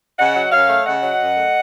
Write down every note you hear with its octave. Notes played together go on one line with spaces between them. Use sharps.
C#3 D#5 F#5
F#3
F#2 C#5 F5
A3
C#3 D#5 F#5
F#3
F#2
A3